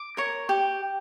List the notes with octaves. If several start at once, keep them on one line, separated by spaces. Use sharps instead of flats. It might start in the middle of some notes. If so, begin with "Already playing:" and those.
Already playing: D6
A#4 C#5
G4